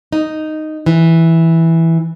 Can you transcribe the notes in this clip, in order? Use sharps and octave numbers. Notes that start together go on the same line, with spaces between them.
D#4
E3